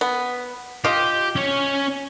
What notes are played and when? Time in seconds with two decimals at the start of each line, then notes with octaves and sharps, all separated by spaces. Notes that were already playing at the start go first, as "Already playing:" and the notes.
0.01 B3
0.85 F4 G4 D#5
1.36 C#4 C#5